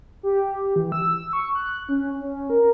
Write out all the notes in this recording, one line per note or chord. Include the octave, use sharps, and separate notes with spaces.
G4
E3
E6
C#6
F#6
C#4
C#4
A#4